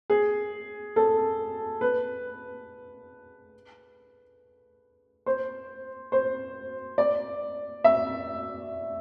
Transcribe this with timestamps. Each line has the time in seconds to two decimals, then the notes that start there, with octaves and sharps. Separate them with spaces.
0.10 G#4
0.96 A4
1.81 B4
5.26 C5
6.12 C5
6.98 D5
7.84 E5